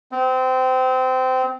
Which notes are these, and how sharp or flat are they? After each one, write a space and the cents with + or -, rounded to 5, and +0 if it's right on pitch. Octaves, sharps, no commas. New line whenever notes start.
C4 -25